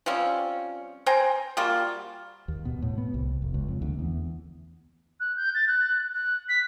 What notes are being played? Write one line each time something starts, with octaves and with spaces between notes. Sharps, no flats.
F3 G3 C4 C#4
C5 G5 G#5 A#5
G3 A#3 F4 F#4
D#2
B2
A2
B3
C2
F1
C#2
F2
D2
E2
F#6
G6
A6
F#6
F#6
B6